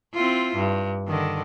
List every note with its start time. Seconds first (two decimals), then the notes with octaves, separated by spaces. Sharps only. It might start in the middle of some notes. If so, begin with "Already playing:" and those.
0.14 C4 E4 F4
0.56 G2
1.07 D3 D#3